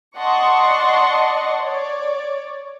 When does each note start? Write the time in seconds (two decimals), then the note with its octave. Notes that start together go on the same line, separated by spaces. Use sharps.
0.17 D5 D#5 F#5 A5 C6 C#6
1.61 C#5 D5